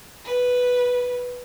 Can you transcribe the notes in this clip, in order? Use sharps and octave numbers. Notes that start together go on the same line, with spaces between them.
B4